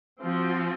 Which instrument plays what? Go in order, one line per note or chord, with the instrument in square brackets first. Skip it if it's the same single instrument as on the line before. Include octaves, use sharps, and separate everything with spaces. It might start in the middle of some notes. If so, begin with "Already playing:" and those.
[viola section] F3 C4 F#4